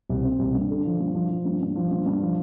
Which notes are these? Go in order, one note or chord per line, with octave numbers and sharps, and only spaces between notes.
C2
C4
C2
G2
D3
F3
G2
F3
F3
G2
G2
F3
G2
G2
F3